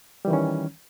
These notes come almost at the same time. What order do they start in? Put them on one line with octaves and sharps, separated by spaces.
G3 E3 D#3 C#4